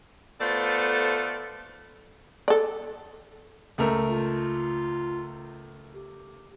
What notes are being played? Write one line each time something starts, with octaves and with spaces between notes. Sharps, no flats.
A3 B3 F4 A4 C5 D5
A4 D5
C#2 A3 A#4
F4
G4